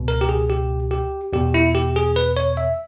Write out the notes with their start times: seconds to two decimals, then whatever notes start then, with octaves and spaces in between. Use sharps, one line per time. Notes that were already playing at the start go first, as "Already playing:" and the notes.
Already playing: C#2 B2
0.08 A#4
0.21 G4
0.29 G#4
0.50 G4
0.91 G4
1.33 E2 B2 G4
1.54 E4
1.75 G4
1.96 G#4
2.16 B4
2.37 C#5
2.57 E5